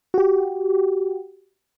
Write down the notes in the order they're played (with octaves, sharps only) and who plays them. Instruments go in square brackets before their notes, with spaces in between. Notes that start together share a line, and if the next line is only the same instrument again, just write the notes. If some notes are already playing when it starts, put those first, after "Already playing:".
[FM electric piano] F#4 G4